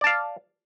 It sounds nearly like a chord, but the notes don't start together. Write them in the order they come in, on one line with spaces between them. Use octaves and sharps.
D5 A5 F5